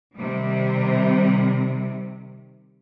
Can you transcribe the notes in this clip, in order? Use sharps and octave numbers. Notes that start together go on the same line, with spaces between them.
C3 D#3 G3